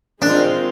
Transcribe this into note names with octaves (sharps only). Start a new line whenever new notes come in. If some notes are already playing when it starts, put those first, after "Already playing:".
D#3 G#3 C4 D4 F4